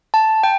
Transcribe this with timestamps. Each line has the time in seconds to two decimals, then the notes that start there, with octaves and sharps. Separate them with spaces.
0.14 A5
0.43 G5